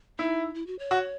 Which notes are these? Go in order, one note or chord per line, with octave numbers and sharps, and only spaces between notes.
D#4 E4
E4
F#4
C#5
F#4